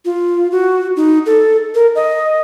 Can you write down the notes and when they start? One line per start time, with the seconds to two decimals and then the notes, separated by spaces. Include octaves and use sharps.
0.05 F4
0.52 F#4
0.97 D#4
1.26 A4
1.75 A#4
1.95 D#5